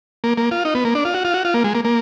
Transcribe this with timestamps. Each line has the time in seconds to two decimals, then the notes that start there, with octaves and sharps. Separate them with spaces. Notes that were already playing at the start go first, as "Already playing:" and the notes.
0.24 A#3
0.38 A#3
0.51 F4
0.65 D#4
0.75 B3
0.85 A#3
0.95 D4
1.05 F4
1.14 F#4
1.25 F4
1.34 F#4
1.45 F4
1.54 A#3
1.64 G#3
1.75 A#3
1.85 A#3